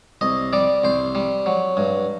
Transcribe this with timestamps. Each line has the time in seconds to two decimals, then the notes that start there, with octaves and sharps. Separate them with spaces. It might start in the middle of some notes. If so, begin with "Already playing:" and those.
0.21 C2 D#5
0.53 G3 D5
0.83 C2 C5
1.15 G3
1.46 F#3
1.77 G2